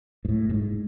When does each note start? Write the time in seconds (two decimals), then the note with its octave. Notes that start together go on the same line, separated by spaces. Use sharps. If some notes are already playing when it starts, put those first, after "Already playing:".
0.25 G#2
0.29 A2
0.49 A2
0.54 G#2